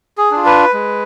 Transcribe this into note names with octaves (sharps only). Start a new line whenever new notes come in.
G#4
D4 F4
B4
G#3